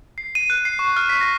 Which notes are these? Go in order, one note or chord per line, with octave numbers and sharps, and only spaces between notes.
C7
D#7
F#6
C7
C#6
F6
B6
A#6